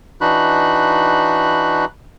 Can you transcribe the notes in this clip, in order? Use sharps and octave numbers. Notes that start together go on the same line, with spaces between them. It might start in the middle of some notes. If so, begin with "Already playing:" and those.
E3 D4 D#4 F#4 B5 F#6